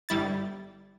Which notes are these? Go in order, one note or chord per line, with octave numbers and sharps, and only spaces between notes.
G1 G3 E4 A6